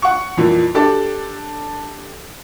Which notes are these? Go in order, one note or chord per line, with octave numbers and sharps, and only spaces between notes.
F#5 C#6
F2 A#2 E3
D4 G4 A4 D5